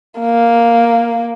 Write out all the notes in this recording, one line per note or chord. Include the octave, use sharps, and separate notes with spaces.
A#3